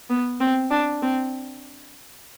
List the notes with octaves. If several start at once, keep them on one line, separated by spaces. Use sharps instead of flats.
B3
C4
D4
C4